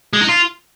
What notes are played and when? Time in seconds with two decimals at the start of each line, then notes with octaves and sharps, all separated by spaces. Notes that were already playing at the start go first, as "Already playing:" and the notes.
0.13 G#3
0.21 D#4
0.29 F4